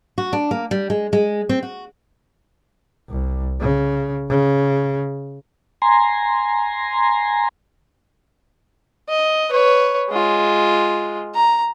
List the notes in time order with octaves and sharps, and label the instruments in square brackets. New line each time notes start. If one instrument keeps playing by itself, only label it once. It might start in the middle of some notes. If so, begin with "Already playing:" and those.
[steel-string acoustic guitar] F#4
D4
A#3
G3
G#3
G#3
C4
F#4
[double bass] C2
C#3
C#3
[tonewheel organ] G#5 A#5 C6
[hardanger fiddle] D#5
B4 C#5
G#3 F4
A#5